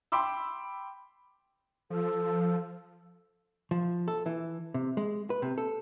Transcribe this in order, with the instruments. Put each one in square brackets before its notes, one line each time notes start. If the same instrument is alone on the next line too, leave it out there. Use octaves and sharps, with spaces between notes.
[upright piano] G5 B5 C6 D6 E6
[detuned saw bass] F3 [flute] A4
[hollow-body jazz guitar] F3
A4
E3
C3
G#3
B4
C3
A4